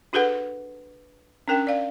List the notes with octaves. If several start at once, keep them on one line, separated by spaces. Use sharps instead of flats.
D4 F#4 G#4 A4 B4 F#5
C#4 D4 A#4 G5
D5 F5